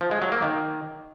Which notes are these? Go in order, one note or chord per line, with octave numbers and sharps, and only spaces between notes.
F3
G#3
F#3
A#3
D#3